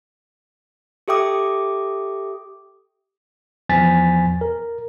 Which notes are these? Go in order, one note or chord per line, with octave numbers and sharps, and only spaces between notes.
G4 A4 E5 G5 D6 D#6
E2 F3 G#5 A6 B6
A#4